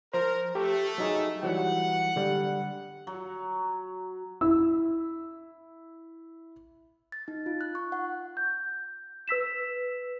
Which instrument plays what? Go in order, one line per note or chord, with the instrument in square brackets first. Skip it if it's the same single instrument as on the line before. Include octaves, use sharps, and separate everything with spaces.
[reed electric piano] F3 C5 [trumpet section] A#4
[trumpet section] A3 [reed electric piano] G4
[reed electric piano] F#3 D#4 G#4
[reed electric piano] E3 F#3 G3 [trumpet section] F#5
[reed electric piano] D3 G3
[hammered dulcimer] F#3
[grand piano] E4 E6
[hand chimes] A6
D#4
F4
F#6
C#6
F#5
[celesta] G6
B4 E6 B6 E7